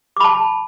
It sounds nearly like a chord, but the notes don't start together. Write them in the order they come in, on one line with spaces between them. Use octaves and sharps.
D6 B5 A5